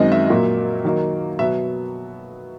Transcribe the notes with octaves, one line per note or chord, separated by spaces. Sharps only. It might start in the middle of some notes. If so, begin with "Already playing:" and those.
Already playing: F#2 D#3 G#3 C4 D#5
E5
A#2 F#3 A#3
D#3 F#3 A#3 D#4
B2 F#3 B3 E5